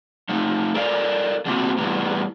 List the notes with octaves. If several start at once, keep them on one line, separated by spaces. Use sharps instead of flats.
F3 A3 D#4
A4 A#4 D5 F5
F3 F#3 A#3 C4 E4 F#4
A2 E3 G3 B3